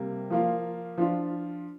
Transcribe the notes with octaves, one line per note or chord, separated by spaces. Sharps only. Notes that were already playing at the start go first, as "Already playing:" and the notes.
Already playing: C3 G3 A#3
F3 A#3 F4
F3 D4 F4